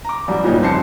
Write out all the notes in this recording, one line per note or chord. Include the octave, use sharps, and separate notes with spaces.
A#5 D6
A1 F#3 G3
G2 A#2 C#3 C#4 D#4 G4
F1 C2 C4 A5 C7 C#7